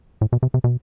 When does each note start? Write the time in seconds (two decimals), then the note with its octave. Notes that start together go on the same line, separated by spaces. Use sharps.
0.21 A2
0.32 B2
0.43 C3
0.54 C3
0.64 B2